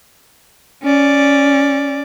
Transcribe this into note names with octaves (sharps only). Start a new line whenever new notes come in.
C#4 D5